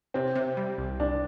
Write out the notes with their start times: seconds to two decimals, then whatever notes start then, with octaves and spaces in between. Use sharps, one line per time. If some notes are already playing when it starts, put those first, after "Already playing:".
0.14 C3 C4
0.35 C3
0.57 G3
0.78 C2
1.00 C2 D4